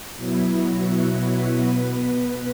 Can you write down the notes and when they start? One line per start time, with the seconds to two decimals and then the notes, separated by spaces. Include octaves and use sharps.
0.16 B2 F#3 B3 E4
0.54 F#4
1.29 B4
1.67 B2 B3
2.03 B4